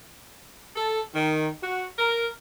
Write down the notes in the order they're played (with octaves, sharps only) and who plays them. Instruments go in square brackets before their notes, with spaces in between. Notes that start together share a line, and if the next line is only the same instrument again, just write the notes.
[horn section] A4
D#3
F#4
A#4